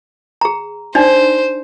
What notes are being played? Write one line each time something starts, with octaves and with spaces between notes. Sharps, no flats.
G#4 A#5
D4 D#4 C5 D5